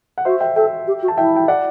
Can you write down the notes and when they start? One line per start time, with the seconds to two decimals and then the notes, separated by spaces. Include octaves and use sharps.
0.18 F#5
0.25 F#4 C5 E5
0.40 E5 G5
0.56 A4 E5 G5
0.87 G4
1.03 F#4
1.08 A5
1.17 E4 E5 G5
1.36 G5
1.48 D5 F#5